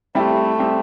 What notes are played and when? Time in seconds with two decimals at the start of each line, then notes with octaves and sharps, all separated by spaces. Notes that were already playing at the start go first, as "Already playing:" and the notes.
0.15 G3 A3 C4 E4 G4
0.59 G3 C4 G4